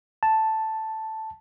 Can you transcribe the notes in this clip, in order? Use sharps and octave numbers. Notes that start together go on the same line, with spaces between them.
A5